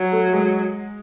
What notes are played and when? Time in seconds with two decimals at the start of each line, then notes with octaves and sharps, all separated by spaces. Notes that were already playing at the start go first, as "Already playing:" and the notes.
Already playing: F#3
0.12 A3 A4
0.33 G#3 G#4